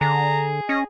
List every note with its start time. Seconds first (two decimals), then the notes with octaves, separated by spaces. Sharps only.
0.01 D3 G#4 A#5
0.69 C#4 D#5